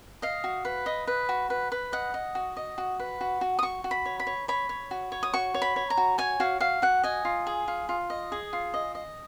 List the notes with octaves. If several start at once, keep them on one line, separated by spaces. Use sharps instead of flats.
D#5 F5
F#4
B4
D#5
B4
F#4
B4
B4
D#5 F#5
D#5
F#4
D#5
F#4
B4
F#4
F#4
D#6
F#4 C#6
F#4
B5
C#5
B5
C#5
C#5 B5
C#5
F#4
C#5
D#6
F#4 C#6
C#5
B5
C#5
A#5
F#4
C#5 G#5
F#4 F5
F#4 F5
F#4 F#5
D#5 G#5
F4
G#4
F4
F4
D#5
G#4
F4
D#5
D#5